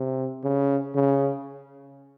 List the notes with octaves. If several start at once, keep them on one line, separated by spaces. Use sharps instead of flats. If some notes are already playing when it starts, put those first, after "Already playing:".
Already playing: C3
C#3
C#3